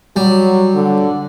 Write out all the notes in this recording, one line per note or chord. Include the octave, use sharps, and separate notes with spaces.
F#3 G3
D3